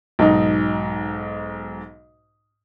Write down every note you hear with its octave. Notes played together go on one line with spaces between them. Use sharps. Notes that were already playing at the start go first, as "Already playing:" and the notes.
B1 G#2 D#4